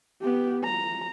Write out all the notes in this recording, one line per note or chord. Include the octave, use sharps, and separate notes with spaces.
B3 G4
A#5